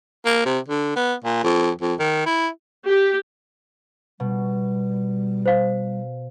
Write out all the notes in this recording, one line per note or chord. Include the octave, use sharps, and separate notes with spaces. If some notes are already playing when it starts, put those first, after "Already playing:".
A#3
C3
D3
B3
A#2
F2
F2
D#3
E4
G4
B2 G3
C5 F5